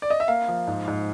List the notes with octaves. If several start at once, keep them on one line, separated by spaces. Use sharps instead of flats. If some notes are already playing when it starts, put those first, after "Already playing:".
D5
D#5
E5
A#3 F5
F3
G#2
G#2